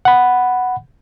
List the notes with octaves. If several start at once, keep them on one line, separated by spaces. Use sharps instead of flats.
F#5 B5